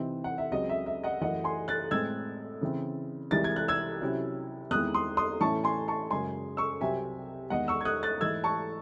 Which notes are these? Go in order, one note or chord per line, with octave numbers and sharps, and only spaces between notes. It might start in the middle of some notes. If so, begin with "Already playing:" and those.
Already playing: C3 E3 C4 D#4
F#5
E5
C#2 C#3 F#3 C4 D#5
E5
E5
D#5 F#5
F#2 E3 A3 D#5 F#5
G#5 C6
F#6 A6
A2 G#3 C4 E6 G#6
C#3 E3 C4
C2 C3 E3 G#3 A6
G#6
F#6
E6 G#6
C3 F#3 C#4 E4
E2 D#3 G#3 C4 E4 D#6 F#6
C6 D#6
C6 D#6
A2 E3 A3 C#4 E4 A5 C#6
G#5 C6
A5 C#6
F#2 C#3 G#3 G#5 C6
C#6 E6
C2 C3 F#3 C4 E5 G#5
E2 D#3 G#3 D#5 F#5
C#6 E6
G#6
D#6 F#6
F#6 A6
G#2 E3 A3 D#4 E6 G#6
A5 C#6